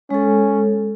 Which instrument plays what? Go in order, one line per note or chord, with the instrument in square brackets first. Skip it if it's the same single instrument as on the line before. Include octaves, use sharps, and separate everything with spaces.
[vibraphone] G#3 A4 [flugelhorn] C#4